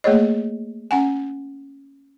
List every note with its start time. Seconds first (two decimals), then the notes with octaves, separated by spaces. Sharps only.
0.04 A3 A#3 G#4 C#5 D#5
0.91 C#4 F#5 G#5